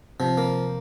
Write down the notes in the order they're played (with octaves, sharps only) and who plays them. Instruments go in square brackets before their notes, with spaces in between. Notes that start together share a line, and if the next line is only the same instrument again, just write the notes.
[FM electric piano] C3 [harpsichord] F3
[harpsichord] A#3